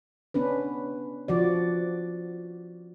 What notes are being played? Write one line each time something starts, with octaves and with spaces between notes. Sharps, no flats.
B3 C#4 D4 B4
F3 F#4 D5